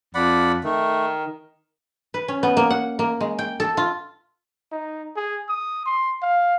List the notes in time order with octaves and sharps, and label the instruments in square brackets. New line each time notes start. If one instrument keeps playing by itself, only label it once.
[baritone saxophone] F2 [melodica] D5 F#5 B5
[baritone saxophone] D#3 [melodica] A3
[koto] B4
C#4
B3
A#3
F#5
A#3
G#3
G5
A4
F4
[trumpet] D#4
G#4
D#6
C6
F5